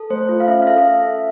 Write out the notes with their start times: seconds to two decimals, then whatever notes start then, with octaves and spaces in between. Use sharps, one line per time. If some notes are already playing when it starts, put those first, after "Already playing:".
Already playing: A4
0.10 A3 C5
0.29 F4
0.40 F5
0.48 C#4 E5
0.62 F5
0.67 A4 E5
0.78 E5